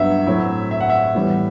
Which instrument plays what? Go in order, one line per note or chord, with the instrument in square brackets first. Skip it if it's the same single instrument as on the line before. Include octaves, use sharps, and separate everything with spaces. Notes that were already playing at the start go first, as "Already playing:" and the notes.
Already playing: [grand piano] G2 F#3 B3 E5 F#5
A2 F#3 C4 E4
E5
F#5
E5
A2 E3 G3 B3